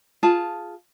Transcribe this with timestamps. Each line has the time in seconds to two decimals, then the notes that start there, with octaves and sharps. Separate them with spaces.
0.23 F4 G#4 A5